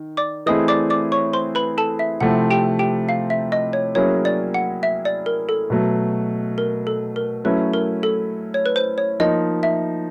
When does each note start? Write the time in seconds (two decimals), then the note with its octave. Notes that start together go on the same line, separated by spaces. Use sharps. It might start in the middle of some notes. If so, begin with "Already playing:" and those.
Already playing: D#3
0.17 D5 D6
0.46 E3 A3 C4 E4 G#4 D#5 D#6
0.68 D5 D6
0.90 D5 D6
1.12 C#5 C#6
1.33 C5 C6
1.55 B4 B5
1.78 A4 A5
1.99 E5
2.20 C3 F3 A3 C4 E4 F#5
2.50 G4 G5
2.79 G4 G5
3.09 F5
3.30 E5
3.52 D#5
3.73 C#5
3.95 F#3 A#3 C#4 E4 G#4 C#5
4.25 D5
4.54 F#5
4.83 E5
5.05 D5
5.26 A#4
5.49 A4
5.70 B2 F#3 A3
6.58 A#4
6.87 A4
7.16 A#4
7.44 F#3 A3 C#4 E4 B4
7.74 A#4
8.03 A4
8.54 C#5
8.66 B4
8.76 C5
8.98 C#5
9.20 F3 A#3 D#4 D#5
9.63 E5